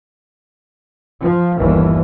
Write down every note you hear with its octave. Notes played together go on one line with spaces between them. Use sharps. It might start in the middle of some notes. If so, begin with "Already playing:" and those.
F3
G1 D#2 E3